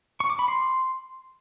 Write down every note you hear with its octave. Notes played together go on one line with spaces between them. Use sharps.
C#6
D6
B5
C6